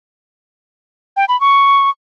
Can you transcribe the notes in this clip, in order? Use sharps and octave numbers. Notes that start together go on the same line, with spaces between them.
G5
B5
C#6